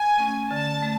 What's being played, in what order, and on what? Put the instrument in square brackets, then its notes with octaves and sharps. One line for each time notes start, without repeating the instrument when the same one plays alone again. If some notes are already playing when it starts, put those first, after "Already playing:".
Already playing: [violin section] G#5
[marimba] A3 C#4
[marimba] D3 [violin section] A5
[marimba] A3